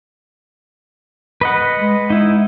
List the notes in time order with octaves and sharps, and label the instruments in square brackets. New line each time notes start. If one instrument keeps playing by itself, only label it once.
[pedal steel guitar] B4 D#5 F#5
[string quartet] G#3
[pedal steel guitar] D#4 E4